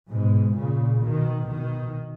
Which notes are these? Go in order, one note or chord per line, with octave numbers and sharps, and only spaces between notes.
G#2 B2
A#2 C#3
B2 D#3
B2 D#3